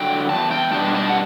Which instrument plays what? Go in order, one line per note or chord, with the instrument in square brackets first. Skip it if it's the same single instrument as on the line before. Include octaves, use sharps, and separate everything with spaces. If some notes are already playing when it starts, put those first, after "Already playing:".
Already playing: [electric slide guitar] D3 F#3 G5
E2 A5
G5
B2 G3 B3 D4 A5
A5
F#5